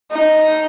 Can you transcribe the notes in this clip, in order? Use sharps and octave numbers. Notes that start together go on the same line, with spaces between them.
D#4